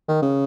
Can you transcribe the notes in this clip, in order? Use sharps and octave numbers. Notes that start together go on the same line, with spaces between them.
D#3
C#3